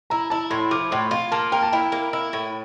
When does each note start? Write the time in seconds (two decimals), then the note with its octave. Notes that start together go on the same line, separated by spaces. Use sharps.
0.10 E4 A#5
0.30 E4 A5
0.50 A2 C6
0.71 F3 D6
0.91 A2 C6
1.11 F4 C6
1.32 A#3 A5
1.52 A#4 G5
1.63 A5
1.72 E4 G5
1.92 A#3
2.13 E4
2.33 A2